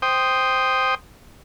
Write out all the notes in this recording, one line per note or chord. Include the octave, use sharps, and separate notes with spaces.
C5 G5 D#6